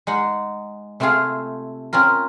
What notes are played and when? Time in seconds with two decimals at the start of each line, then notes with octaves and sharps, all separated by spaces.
0.07 G#3 D#4 F#5
1.00 C3 A3 C4 F4 G#4 F5
1.93 C4 C#4 F4 A#4